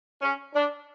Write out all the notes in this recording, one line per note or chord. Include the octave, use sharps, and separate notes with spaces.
C#4
D4